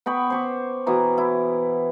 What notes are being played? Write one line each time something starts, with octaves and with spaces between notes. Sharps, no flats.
B3 G5 B5 C#6
C5 C#6 D6
B2 E3 A#5
E4